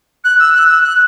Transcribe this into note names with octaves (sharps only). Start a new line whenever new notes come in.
F#6
E6
F#6
E6
F#6